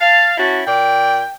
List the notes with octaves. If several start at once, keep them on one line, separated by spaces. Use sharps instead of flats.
F5 A5
C#4 E4 F#4 A5
A#2 D5 G5